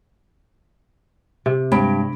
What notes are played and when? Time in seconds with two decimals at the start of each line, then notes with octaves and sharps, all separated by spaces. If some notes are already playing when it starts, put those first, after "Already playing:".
1.46 C3
1.72 G2 G#3 C4 B5 D7